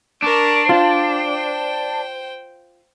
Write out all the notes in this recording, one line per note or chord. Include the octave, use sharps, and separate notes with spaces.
D4 A#4 C#6
F4 C5 G5